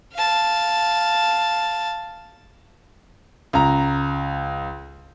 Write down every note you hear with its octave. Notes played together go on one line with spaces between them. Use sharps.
F5 A5
C#2 A#5